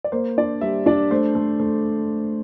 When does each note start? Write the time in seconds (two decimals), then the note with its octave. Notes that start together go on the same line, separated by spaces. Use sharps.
0.04 D5
0.12 A#3 C5
0.38 D4 D5
0.61 G3 E5
0.86 D4 D5
1.11 A3 C5
1.35 A3
1.60 A3